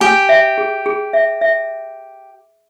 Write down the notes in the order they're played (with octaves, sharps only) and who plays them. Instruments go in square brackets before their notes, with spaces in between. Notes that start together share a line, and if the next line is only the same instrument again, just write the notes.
[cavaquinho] G4 [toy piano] G#5
[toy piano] E5
G#4
G#4
E5
E5